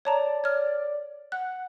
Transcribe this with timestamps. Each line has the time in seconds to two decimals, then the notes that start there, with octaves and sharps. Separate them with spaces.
0.05 C#5 D5 A5 A#5
0.44 C#5 F6
1.32 F#5 F#6